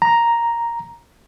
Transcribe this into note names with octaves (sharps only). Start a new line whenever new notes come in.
A#5